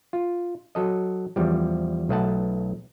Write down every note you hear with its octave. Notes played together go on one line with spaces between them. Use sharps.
F4
F#3 A4 D#5
E2 F3 G3
B1 A3 D#5 F#5 A5